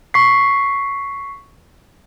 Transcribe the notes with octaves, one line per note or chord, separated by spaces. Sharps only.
C#6 B6 C7